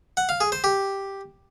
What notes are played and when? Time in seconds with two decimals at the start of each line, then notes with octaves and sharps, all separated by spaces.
0.17 F#5
0.29 F5
0.41 G#4
0.52 C5
0.64 G4